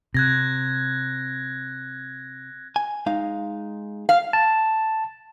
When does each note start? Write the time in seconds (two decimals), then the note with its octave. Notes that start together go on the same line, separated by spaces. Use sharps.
0.14 C3 F#6 G#6 A#6
2.76 G#5
3.06 G#3 D#4 F5
4.09 F5
4.33 A5